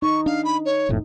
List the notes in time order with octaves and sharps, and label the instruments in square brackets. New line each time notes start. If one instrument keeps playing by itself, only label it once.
[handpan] D#4 [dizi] C#6
[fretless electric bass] D4 [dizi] F5
[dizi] B5
C#5
[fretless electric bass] E1 F2 A2